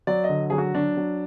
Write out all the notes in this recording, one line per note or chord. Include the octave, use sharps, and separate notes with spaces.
F#3 D5
D#5
D3
F#3 G#4
F#4
F#3 D4
F#3